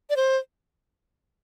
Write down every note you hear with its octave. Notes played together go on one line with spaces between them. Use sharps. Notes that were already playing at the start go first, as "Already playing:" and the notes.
D5
C5